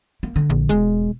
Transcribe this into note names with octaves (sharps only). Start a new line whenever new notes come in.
A#3
D3
A#1
E1 G#3